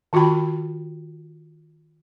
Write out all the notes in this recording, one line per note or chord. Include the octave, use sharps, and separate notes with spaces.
D#3 F4 F#4 G5 B5